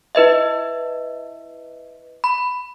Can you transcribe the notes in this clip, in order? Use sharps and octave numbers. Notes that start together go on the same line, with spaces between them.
E4 B4 D#5 E5
B5